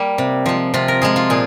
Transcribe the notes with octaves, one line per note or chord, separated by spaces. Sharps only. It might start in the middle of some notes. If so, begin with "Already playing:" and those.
Already playing: G3 A#3 G4
C3
F3 G#3
C3 F4
A#4
F3 G#3 G#4
F4
A#2 G#4